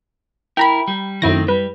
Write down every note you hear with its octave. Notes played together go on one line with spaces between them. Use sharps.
E4 A#4 G5 A#5 B5
G3
F#2 D#3 A3 C4 E4 A#6
G3 B4